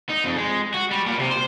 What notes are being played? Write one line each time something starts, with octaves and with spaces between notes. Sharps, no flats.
D#4
F2
G#3
F#4
G3
A#2
C3
C5